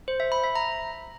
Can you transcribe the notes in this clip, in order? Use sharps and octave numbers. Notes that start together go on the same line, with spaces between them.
C5
E5
B5
E5
A#5